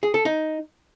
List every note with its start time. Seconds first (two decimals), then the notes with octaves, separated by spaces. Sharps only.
0.03 G#4
0.14 A4
0.25 D#4